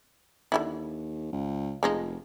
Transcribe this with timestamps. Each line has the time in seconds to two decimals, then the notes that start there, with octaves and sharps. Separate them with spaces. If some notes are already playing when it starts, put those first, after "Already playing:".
0.52 D#2 D3 D#4 E4
1.32 C#2
1.83 F1 F3 G#3 D#4